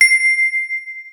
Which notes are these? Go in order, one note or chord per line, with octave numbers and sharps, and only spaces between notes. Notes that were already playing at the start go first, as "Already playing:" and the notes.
C7